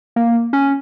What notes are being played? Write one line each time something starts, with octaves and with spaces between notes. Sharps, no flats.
A#3
C#4